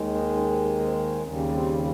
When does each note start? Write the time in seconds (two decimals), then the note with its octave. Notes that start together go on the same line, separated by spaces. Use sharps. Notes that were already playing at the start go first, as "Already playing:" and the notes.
Already playing: D#2 D#3 G#3
0.15 D#4
0.37 C#4
0.51 C4
0.65 C4
0.80 C4
1.22 D#2 C#3 G3 C4
1.37 C#4
1.51 C4